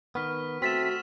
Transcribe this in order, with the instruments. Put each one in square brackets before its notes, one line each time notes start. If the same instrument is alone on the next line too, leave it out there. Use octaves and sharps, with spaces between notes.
[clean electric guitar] D#3 B3 [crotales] C#6 F6 B6
[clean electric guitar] A3 C4 [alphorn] F#4 [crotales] E6 A6 E7 [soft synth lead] B6